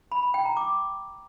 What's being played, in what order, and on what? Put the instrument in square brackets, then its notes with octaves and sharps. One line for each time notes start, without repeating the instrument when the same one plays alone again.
[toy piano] B5
B5
G5
A#5
D6